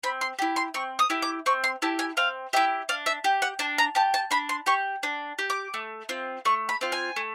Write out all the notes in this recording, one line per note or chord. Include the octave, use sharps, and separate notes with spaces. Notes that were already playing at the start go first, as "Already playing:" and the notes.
C4 B5
C6
E4 G4
C6
C4 C#6
D#6
E4 G4
D6
C4 C#6
C6
E4 G4 A5
G#5
C4 F5
E4 G4 E5
D4 F5
E5
G4
F#5
D4 A5
A#5
G4 A5
A5
D4 B5
C6
G4 C#6
D4
G4
D6
A3
C4 F4
A3 C#6
B5
C4 F4
G#5
A3